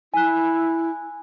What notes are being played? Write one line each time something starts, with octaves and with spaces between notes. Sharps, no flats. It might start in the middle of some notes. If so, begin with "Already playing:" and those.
E4 G#5 F#6